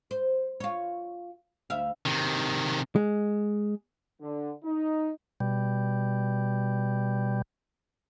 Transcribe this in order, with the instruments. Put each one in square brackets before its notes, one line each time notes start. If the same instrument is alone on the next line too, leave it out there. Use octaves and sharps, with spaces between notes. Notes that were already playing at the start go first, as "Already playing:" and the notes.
[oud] C5
F4 C#5
D2 E5 F5
[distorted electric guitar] C3 D#3
[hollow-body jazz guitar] G#3
[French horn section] D3
D#4
[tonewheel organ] B2 G3